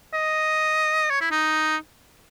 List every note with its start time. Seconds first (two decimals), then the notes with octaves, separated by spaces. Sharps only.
0.14 D#5
1.10 C#5
1.21 E4
1.31 D#4